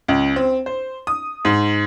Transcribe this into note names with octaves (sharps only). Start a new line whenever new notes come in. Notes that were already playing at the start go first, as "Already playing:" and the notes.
C#2
C4
C5
D#6
G#2